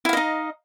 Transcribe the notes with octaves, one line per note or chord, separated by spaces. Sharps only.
D#4 E4 D#5 F5